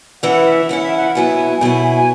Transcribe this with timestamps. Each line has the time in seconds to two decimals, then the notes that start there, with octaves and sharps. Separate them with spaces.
0.23 E3 C#4 E4 F#5
0.45 E5
0.69 E3 C#4 E4 F#5
0.83 E5
0.96 F#5
1.15 B2 F#3 B3 E4 G#5
1.61 B2 F#3 B3 E4
1.95 G#5